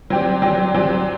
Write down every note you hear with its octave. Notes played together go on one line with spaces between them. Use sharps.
F#3 C4 G4 D5
F#3 C4 G4 D5
F#3 C4 G4 D5